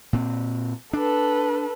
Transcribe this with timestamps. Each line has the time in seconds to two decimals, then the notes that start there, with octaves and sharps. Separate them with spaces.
0.13 A#2 C4
0.93 D4 A4 B4